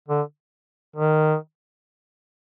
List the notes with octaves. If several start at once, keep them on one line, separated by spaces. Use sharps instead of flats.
D3
D#3